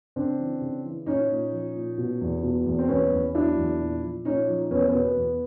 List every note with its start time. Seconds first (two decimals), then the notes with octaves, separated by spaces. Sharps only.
0.16 C#3 C4 D4
0.39 E3
0.61 C#3
0.85 E3
1.06 A#2 C#4 D#4
1.30 A#2
1.52 F3
1.75 A#2
1.98 B2
2.21 E2
2.43 B2
2.66 E2
2.79 C4
2.88 E2 B3 C#4
3.12 E2
3.35 F#3 D4 E4
3.57 E2
3.80 A#2
4.02 F3
4.25 A#2 C#4 D#4
4.48 F3
4.70 E2 B3 C#4
4.86 B3 C#4
4.93 B2
5.01 B3
5.17 E2